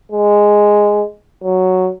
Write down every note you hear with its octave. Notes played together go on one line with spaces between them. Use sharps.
G#3
F#3